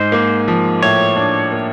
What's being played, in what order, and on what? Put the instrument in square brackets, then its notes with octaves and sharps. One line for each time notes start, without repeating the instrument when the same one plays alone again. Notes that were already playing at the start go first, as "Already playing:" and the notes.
Already playing: [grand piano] G#2 D#4 [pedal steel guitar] C5
[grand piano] A#3
F3
[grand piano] A2 [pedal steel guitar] C#5
[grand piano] D4
A#3